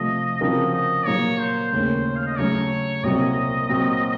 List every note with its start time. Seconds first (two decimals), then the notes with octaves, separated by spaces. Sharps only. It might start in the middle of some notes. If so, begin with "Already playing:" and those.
Already playing: C3 F3 A3 D#5
0.41 C#3 F3 C4 F#4 A#4 D#5
0.74 D#5
1.06 A#2 F#3 A#3 C#5
1.40 C5
1.72 D#2 C#3 A3 C#4 C5
2.16 F5
2.26 D#5
2.38 C#3 F#3 A3 C#4 C#5
3.03 C2 A#2 F#3 C4 F#4 D#5
3.69 A#2 F#3 C4 F#4